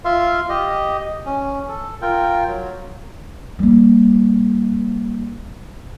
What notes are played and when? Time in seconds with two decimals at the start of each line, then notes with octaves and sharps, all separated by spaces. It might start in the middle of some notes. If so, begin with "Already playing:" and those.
0.05 F4 E5 F5 C6
0.49 G4 D#5
1.26 C#4
1.68 A4
2.02 F4 A#4 G5
2.47 F#3
3.59 G3 A#3